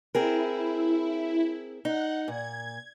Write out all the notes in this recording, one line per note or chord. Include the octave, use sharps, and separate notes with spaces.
C4 E4 G#4 A#4
D#4 F#5
A#2 G#6